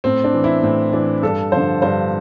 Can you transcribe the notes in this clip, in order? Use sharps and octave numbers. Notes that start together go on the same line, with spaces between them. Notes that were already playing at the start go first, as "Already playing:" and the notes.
A2 C4
D4
E3
E4
A2 C4
E3 D4
G2 A4
D3 F3 C5
G2 C5